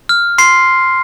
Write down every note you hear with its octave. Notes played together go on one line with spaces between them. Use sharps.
F6
C6 C7